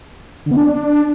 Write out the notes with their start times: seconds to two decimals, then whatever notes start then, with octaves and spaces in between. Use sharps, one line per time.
0.46 D3
0.51 B3
0.56 D4